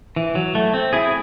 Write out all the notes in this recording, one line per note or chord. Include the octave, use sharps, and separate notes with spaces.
E3
F#3
A3
C4
E4 G#4